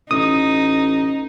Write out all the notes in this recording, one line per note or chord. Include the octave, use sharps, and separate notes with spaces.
A1 D#4 D#6